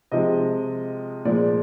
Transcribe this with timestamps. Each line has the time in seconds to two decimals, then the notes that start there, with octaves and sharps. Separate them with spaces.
0.12 C3 F3 G#3 D#5
1.25 A#2 F3 G#3 D5